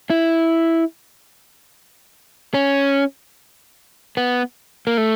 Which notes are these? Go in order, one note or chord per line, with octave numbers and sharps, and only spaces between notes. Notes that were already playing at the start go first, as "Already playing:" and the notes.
E4
C#4
B3
A#3
A3